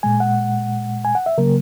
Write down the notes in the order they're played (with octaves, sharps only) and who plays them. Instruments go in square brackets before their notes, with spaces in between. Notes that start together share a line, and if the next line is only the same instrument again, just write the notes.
[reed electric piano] A#2 G#3 G#5
F#5
G#5
F#5
E5
C#3 F#3 A#3 A#4